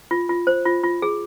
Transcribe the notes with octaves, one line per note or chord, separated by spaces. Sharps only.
F4
F4
C5
F4
F4
G#4